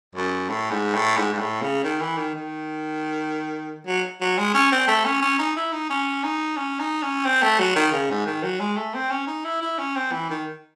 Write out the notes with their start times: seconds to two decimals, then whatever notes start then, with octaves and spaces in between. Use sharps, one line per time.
0.15 F#2
0.49 A2
0.70 G#2
0.94 A2
1.17 G#2
1.33 G#2
1.39 A2
1.62 C#3
1.84 D#3
2.00 E3
2.17 D#3
2.34 D#3
3.86 F#3
4.21 F#3
4.38 G#3
4.54 C#4
4.72 C4
4.87 A3
5.05 C#4
5.22 C#4
5.39 D#4
5.56 E4
5.73 D#4
5.90 C#4
6.23 D#4
6.57 C#4
6.79 D#4
7.02 C#4
7.25 C4
7.42 A3
7.59 F#3
7.76 D#3
7.92 C#3
8.10 G#2
8.26 D#3
8.43 F#3
8.60 G#3
8.76 A3
8.94 C4
9.10 C#4
9.27 D#4
9.44 E4
9.61 E4
9.78 C#4
9.95 C4
10.12 E3
10.30 D#3